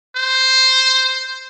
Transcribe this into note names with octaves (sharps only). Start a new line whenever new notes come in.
C5